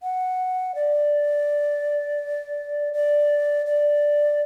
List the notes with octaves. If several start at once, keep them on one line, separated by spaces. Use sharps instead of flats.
F#5
D5
D5
D5